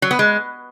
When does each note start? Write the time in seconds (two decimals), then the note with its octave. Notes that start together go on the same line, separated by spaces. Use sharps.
0.02 F#3
0.11 B3
0.19 G#3